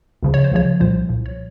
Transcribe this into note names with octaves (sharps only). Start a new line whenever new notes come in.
C#2 C#3 F3
C#5
C5
C#2 C#3 F3 C#5
C2 A#2 F3 C5
C2 A#2 F3
C#5